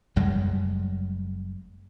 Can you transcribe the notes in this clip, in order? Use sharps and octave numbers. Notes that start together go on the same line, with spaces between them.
F#1 F#2 G3 G#3